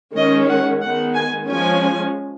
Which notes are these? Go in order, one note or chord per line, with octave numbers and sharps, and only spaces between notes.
D#3 G#3 C#4 D#5
F#5
D#3 G#3 B3 F#5
G#5
F3 G#3 C#4 G#5